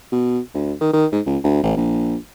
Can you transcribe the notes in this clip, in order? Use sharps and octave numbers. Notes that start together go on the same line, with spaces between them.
B2
D2
D#3
D#3
G#2
C#2
D2
A1
A#1